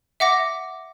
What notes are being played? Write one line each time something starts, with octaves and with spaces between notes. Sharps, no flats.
E5 F#5 D6 A#6